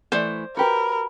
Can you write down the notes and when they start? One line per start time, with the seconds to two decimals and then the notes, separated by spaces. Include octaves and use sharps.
0.12 E3 A3 C5 D5
0.57 F#4 G4 A#4 B4 B5